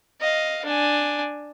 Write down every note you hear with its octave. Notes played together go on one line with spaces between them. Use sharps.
D#5 F5
D4 G#5